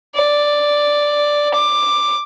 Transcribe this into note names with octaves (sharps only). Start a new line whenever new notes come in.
D5
D6